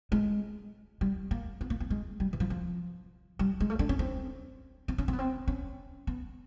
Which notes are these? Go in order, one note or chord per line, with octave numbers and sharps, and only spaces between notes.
G#3
G3
A#3
B3
A#3
B3
G#3
G3
E3
F3
F3
G3
G#3
A3
D4
C#4
C4
C4
C#4
C4
B3
C4
C#4
B3